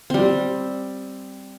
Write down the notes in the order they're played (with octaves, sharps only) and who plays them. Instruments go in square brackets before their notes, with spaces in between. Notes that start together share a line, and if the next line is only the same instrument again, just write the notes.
[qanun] G3 C4